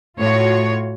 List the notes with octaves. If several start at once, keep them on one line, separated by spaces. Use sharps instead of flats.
A2 F4 F#4 C#5